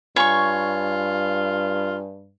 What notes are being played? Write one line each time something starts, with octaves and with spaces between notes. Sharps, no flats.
G2 F4 C#5 G#5 B5 C#6